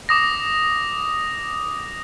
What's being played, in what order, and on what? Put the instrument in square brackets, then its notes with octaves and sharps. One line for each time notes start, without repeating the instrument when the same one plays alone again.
[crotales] D6 D#6 A#6